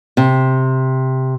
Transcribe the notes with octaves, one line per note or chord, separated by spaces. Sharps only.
C3